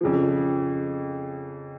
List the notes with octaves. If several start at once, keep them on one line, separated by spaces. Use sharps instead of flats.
F2 C#3 F3